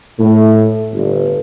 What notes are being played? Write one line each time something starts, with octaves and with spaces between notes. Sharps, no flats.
A2
G1